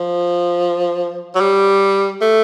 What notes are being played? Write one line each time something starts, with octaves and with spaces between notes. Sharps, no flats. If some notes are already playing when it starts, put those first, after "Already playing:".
Already playing: F3
F#3
G3
A3